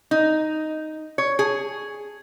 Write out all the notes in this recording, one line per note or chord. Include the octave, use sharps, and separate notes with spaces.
D#4
C#5
G#4